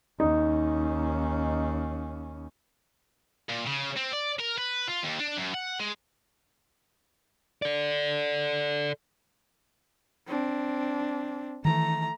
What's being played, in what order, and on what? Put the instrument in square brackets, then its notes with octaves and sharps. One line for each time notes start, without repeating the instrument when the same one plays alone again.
[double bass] D#2 C#4 [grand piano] D#4
[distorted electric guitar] A#2
C#3
C4
D5
A#4
B4
F4
D#2
D4
F#2
F#5
G#3
[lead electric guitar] A4 D5
[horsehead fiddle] C4 D4
[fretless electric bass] D#3 E3 [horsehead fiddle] A3 A#5